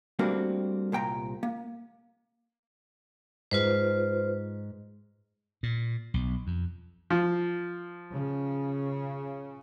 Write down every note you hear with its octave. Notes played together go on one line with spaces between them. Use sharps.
G3 A3 A#3 C4 D4 F#4
C2 A#2 G5 A#5
A#3
G#2 F4 B4 C5
A#2
B1
F2
F3
C#3